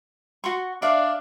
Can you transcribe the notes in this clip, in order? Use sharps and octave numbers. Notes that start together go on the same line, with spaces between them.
F#4 C6 C#6
D4 D5 E5 F5